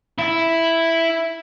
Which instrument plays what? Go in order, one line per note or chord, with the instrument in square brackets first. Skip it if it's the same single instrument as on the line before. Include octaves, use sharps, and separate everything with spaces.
[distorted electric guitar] E4 E5